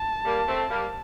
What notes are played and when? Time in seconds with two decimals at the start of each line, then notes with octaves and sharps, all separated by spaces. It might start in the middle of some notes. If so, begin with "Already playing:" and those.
Already playing: A5
0.25 G3 A#3
0.47 A3 C4
0.70 G3 A#3